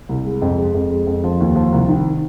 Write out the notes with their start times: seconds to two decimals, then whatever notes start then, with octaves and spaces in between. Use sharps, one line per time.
0.09 C2
0.25 G#3
0.41 F2
0.58 G#3
0.74 F2
0.90 G#3
1.07 F2
1.24 F3
1.40 D#2
1.56 F3
1.72 C2
1.89 D#3